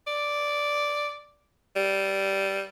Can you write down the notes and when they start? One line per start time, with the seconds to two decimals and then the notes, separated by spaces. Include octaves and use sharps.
0.07 D5
1.76 G3